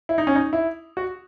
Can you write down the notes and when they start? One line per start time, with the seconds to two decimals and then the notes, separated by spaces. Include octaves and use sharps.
0.09 E4
0.18 D#4
0.27 C#4
0.35 D#4
0.53 E4
0.97 F#4